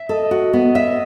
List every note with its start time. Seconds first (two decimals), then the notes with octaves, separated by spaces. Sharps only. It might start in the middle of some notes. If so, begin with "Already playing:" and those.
Already playing: E5
0.09 A4 D#5
0.31 F#4
0.53 B3
0.75 E5